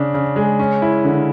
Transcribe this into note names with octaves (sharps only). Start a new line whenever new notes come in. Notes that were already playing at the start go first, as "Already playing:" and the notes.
Already playing: C#3 D4
C#3
G#3
C#4
E4
D3